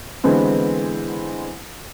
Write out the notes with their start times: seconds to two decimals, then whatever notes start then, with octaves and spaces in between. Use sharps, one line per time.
0.24 D3 E3 G#3 B3 C4